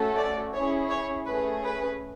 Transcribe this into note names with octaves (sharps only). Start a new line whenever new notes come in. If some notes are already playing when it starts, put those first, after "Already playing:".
Already playing: A3 C#4 F#4 A4
D5
C#4 E4 G#4 C#5
C#5
A3 C#4 G#4 B4
B4